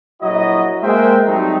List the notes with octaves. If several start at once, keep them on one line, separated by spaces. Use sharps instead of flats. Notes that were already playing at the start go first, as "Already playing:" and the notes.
A#1 F#3 E4 F#4 D#5
G#3 A#3 A#4 C5 E5 G5
F#3 G3 A3 C4 D#4